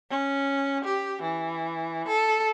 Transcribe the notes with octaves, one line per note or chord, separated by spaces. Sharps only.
C#4
G4
E3
A4